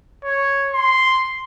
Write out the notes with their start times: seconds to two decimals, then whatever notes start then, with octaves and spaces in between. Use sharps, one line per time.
0.24 C#5
0.74 C6